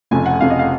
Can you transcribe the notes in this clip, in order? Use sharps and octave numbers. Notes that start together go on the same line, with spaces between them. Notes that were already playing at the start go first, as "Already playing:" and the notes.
F1 F2 C#3 G#5
F#5
F1 F2 C#3 F5
D#5
F5